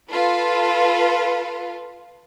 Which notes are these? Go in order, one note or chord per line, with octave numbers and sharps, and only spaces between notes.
F4 A4 B4